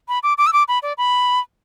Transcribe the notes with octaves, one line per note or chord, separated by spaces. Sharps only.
B5
D6
D6
E6
D6
B5
D5
B5